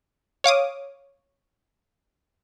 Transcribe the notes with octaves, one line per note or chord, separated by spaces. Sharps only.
C#5 F5 D6 D#6